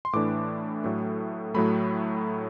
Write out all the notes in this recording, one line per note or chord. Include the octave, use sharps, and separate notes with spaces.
C6
A2 E3 A3 D4 D6
A2 F#3 A3
A2 F#3 A3 B5